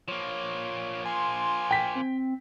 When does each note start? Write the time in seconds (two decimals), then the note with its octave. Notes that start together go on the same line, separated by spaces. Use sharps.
0.08 F3 A#3 C#5
1.05 G#5 C6
1.71 G5 B6
1.95 C4